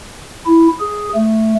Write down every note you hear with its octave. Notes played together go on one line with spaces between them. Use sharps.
E4
G#4
A3